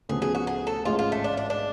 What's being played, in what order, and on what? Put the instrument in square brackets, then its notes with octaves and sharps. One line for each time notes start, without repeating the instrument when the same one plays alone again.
[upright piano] D2 C#3 F3 B3 [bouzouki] G#4
[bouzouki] G#4
F#4
G#4
A4
[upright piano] A1 G#2 G#3 C#4 [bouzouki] F4
[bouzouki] F4
A3
D4
D4
D4